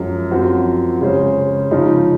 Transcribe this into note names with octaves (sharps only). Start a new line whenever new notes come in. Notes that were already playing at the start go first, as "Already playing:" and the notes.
Already playing: F#2 F3 G#3 C#4
F#2 F3 C4 F#4 C5
C#3 G#3 C#4 G#4 C5
C#3 F3 G#3 D#4